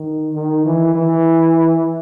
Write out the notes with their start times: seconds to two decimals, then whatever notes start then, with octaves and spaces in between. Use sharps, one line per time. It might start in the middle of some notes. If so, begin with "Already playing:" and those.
Already playing: D#3
0.34 D#3
0.65 E3
0.95 E3